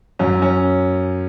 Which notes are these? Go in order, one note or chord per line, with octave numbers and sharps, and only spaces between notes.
F#2 C#4
C#4